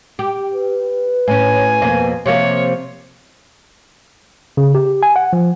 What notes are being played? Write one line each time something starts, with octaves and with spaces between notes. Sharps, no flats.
G4
B4
A2 C#4 G#5
F2 B2 A#3
C3 F3 A#3 C#5
C#3
G4
G#5
F#5
F3